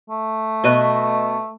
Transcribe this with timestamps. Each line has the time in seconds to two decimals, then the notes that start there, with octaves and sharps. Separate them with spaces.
0.10 A3
0.64 B2 B4 D#5